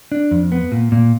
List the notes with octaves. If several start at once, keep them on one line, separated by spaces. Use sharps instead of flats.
D4
F2
B3
A#2
A#2